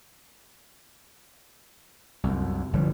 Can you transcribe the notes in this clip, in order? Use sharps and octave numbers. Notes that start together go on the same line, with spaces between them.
C2 F#2
G1 D3 F3 G3